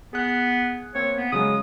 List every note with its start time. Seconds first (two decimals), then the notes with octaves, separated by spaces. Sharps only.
0.13 B3 G#4 F#6
0.95 A#3 C4 C#5
1.17 B3
1.32 C#3 F#3 G#3 D#6